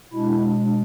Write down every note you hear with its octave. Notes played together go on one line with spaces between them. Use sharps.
B2 G#3 D4 E4